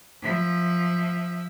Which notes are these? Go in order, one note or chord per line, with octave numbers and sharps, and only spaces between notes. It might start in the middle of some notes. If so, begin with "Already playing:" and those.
F3 E5